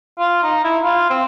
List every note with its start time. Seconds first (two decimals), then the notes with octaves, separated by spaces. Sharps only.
0.19 F4
0.43 D#4
0.64 E4
0.84 F4
1.10 C4